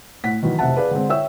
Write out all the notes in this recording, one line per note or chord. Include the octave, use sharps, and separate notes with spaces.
A2 F#5 B6
D#3 E3 F#3
F1 C3 E5 F#5 A5
G#4 B4 D5 F5
D3 G#3 C4
C#5 E5 G5 E6